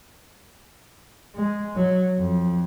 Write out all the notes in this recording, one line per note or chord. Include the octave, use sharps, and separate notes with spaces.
G#3
F#3
F2